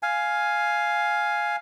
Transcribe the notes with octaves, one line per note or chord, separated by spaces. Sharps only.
F5 G#5